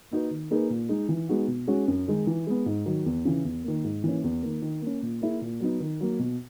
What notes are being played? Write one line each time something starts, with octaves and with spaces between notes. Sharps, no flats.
A#3 D#4 F#4 B4
D#3
A#3 D#4 G#4 B4
A#2
G#3 D#4
E3
G#3 B3 D#4 F#4
B2
G#3 C#4 F#4
F#2
D#3 G#3 D#4
E3
G#3 B3
G#2
D#3 F#3
E2
C#3 E3
E2
D#3 A#3
G#2
E3 A#3 C#4
E2
D#3 A#3
D#3
A#3 C#4
A#2
A#3 E4 G#4
A#2
F#3 B3 D#4
D#3
F#3 A#3
B2